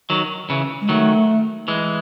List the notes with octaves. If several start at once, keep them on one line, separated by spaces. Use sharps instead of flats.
D#3 F#3
C#3 E3
G#3
D#3 F#3 A3
E3 G#3